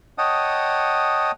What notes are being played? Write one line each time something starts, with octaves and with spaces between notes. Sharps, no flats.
C#5 D#5 F#5 G5 A5 D#6